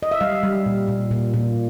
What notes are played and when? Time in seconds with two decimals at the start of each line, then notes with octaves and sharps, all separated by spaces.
0.03 D#5
0.11 E5
0.21 G3 F5
0.43 G3
0.66 A#2
0.88 A#2
1.11 A#2
1.34 A#2